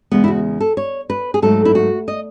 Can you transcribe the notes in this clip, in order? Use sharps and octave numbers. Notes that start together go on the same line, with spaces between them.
E2 C#3 G#3 B3
E4
F#4
A4
C#5
B4
G#4
G#2 F#3 A3 A4
E4
F#4
D#5